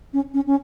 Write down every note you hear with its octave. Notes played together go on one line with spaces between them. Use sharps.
C#4
C#4
C#4